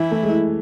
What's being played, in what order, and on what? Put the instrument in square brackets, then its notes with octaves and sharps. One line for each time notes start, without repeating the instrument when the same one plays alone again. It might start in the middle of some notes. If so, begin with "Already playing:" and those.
Already playing: [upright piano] E3 [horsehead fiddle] E4
[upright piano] A3
G#3